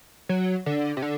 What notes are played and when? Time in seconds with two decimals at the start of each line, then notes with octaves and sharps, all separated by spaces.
0.29 F#3
0.66 D3
0.97 C3
1.02 D3